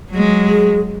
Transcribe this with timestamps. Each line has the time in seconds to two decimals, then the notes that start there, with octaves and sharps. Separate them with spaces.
0.10 F#3 G#3
0.47 G#4